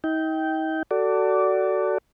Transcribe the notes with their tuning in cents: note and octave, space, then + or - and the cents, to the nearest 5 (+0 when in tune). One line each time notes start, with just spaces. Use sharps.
D#4 +40 G5 -10
F#4 +20 A4 +20 D5 -15